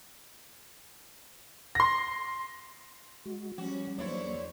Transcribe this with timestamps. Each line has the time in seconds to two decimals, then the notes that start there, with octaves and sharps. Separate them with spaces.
1.75 C6 A#6
3.26 G#3 F#4
3.58 F3 G3 C#4 F#4
3.98 E2 F#3 A#3 D4 E4 C5 C#5